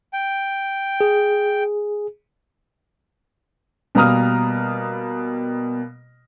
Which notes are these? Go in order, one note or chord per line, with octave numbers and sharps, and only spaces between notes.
G5
G#4
B2 G3 A#3 A#5 D#6 F6